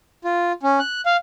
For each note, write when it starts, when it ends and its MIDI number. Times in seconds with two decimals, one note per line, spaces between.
0.24 0.52 65
0.63 0.79 61
0.79 1.01 90
1.06 1.17 77